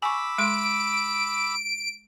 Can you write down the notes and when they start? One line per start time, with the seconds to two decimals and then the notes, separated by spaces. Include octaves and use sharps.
0.02 G#5 B5 C#6 D6 E6
0.38 G#3 C6 D7